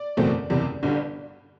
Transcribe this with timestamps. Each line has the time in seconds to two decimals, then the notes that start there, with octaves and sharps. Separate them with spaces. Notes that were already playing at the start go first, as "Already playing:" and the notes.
Already playing: D5
0.17 F#1 E2 B2 A3 C4
0.50 F#1 E2 C3
0.83 G1 G2 D3 G3